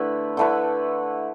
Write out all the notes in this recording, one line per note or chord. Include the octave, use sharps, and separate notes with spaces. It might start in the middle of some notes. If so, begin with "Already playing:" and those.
Already playing: D3 A3 E4 B4
D3 A3 E4 B4